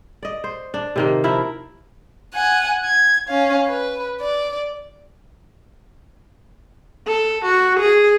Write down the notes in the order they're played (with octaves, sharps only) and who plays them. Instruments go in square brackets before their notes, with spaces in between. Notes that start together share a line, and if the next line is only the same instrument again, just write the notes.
[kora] D5 D#5
C5
D4
C3 D#3 A#3
F3 E4 A#4 E5
[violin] F#5 G#5
G#6
C#4 F5
B4
D5
[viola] A4
F#4
G#4